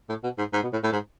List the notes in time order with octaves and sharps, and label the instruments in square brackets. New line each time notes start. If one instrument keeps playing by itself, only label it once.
[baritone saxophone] A2
B2
G#2
G#2
B2
A2
A2
G#2